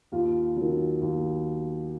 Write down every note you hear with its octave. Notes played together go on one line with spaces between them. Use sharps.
D#2 F4
F#3
D#3
D#2